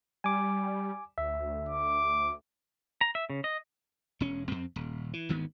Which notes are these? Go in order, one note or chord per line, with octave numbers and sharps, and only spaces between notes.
G3 G#5 D6
D2 E5
D6
A#5
E5
C#3
D#5
E1 C#4
F2 C4
D#1
E3
G#1 D2 D#3 B3